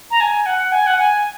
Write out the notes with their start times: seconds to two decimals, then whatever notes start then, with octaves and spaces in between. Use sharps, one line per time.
0.11 A#5
0.21 G#5
0.46 F#5
0.72 G#5
0.87 F#5
0.99 G#5